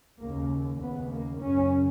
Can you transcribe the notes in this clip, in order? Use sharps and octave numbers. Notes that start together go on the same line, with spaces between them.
D#2 C#3 A#3
D#2 C#3 B3
A#3
F#2 C#3 C#4